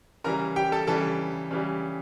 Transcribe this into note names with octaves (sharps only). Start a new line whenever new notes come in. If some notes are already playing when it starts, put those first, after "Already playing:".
C#3 E3 G3 A#4 A#5
G4 G5
A4 A5
C#3 E3 G3 A4 A5
C#3 E3 G3